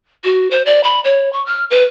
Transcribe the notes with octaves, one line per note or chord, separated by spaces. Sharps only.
F#4
C5
D5
B5
C#5
C#6
F6
B4